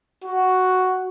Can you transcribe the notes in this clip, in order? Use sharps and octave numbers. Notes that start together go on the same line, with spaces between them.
F#4